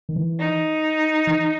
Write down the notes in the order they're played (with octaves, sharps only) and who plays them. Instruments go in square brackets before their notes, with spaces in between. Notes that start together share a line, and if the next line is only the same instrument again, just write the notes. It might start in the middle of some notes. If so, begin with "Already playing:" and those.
[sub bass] D#3
E3
[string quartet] D#4
[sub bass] E3